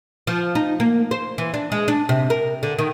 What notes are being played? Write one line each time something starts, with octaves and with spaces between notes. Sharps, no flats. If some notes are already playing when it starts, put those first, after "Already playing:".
F3
D#4
A#3
C5
E3
D4
G#3
D4
C3
A#4
D3
D#3